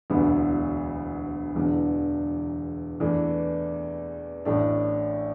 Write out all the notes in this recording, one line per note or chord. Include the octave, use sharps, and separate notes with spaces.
E1 D2 D3 B3 E4
E1 E2 D3
E2 E3 A3 D4
A1 A2 A3 D4